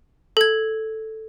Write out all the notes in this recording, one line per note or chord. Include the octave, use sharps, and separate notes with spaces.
A4 G#6